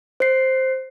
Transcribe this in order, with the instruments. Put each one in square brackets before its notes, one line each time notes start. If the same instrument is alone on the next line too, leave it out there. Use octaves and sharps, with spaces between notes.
[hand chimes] C5 C7